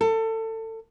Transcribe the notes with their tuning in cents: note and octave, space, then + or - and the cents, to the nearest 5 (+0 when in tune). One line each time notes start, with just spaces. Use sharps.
A4 +25